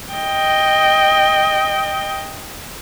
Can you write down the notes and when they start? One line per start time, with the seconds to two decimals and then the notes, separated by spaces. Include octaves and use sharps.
0.14 D#5 G5